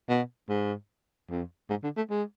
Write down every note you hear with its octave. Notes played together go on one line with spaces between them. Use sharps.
B2
G#2
F2
G#2
D3
A3
G#3